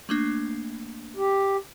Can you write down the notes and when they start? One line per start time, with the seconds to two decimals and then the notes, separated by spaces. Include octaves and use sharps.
0.09 A3 A#3 D4
1.17 G4